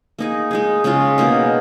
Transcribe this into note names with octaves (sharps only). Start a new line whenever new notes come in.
A#3 D#4 G#4
G#3 D#4 G#4
C#3 G#3 C#4 F4
B2 A#3 D#4